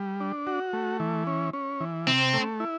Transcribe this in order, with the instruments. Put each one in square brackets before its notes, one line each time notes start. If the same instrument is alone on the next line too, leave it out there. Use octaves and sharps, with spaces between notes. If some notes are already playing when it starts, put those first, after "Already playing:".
Already playing: [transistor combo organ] G3
D4
F#4
A3
E3
C#4
C#4
E3
[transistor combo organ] C3 [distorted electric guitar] C4
[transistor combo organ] A3
E4